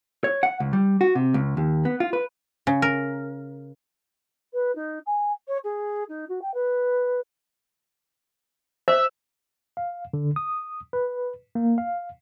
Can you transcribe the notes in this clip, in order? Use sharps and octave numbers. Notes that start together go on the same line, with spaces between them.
C#5
F#5
C#2
G3
F#4
C3
C#2
D#2
B3
F4
B4
C#3
A#4
B4
D#4
G#5
C#5
G#4
D#4
F#4
G5
B4
C5 E5
F5
D3
D#6
B4
A#3
F5